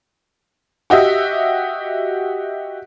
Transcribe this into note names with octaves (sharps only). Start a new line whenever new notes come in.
F#4 G4 D#5 E5